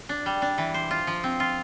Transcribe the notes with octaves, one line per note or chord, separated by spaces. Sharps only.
D4
G3
D4
E3
C5
F4
F3
C4
F4